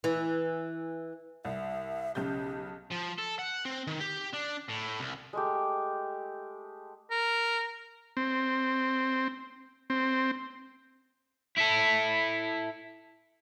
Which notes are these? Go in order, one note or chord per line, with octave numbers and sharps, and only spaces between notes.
E3
C2 E5
B1 C#3 G4 G6
F3
A4
F#5
C4
D#3
G4
D4
A2
C2
G#3 A3 G4
A#4
C4
C4
E4 A4